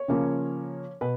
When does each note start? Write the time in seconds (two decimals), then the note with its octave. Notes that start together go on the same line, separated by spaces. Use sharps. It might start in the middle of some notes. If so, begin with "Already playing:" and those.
Already playing: C#5
0.08 C#3 F3 A#3 C#4
1.01 B2 B4